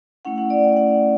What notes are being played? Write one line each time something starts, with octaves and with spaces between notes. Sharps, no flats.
A3 C#4 E4 F#5
F#5
D5
G5
F#5